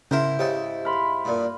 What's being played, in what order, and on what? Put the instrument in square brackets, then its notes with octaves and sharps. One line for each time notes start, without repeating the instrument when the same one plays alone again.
[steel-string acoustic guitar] G#2 E4 [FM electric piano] C#3 [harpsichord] A#4 C5 [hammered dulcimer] G5
[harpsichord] C#3 A4 [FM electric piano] G4 C5 D#5
[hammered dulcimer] F5 B5 C6
[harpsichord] G2 A#2